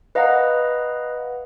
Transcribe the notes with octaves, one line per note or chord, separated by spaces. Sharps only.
B4 D#5 F5 F#5 A#5